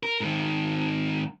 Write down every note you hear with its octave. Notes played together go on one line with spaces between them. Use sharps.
A#4
G#2 D#3